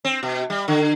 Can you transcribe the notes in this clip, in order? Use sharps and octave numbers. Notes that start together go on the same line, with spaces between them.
C4
B2
G3
D3